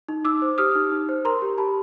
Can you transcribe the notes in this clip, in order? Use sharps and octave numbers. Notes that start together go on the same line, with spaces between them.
D#4
D#4 D6 E6
C5
G4 D#6 F6
D#4
D#4
C5
A#4 A#5 C6
G4
G4 A5 B5